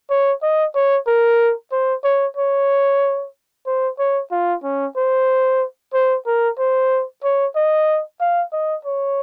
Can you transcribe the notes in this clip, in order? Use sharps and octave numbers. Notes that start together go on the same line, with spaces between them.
C#5
D#5
C#5
A#4
C5
C#5
C#5
C5
C#5
F4
C#4
C5
C5
A#4
C5
C#5
D#5
F5
D#5
C#5